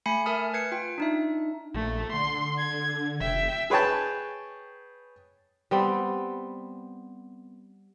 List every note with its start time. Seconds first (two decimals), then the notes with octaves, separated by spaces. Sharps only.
0.06 A3 G#5 B5 C7 C#7
0.26 A#4 E5 G#5 A5 D#6 F6
0.54 B4 G#6 C7 C#7
0.72 F4 G5
0.98 D4 D#4 E5
1.74 A#1 A3
2.13 D3 C6
2.58 G#6
3.21 F1 E5 G5
3.70 G#4 B4 C#5 G5 A5
5.71 G3 B3 C4